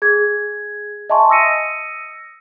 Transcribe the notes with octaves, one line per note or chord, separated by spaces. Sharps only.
G#4 G#6
D#5 E5 G#5 A5 C6 C#6
D#6 E6 A#6 C#7 D#7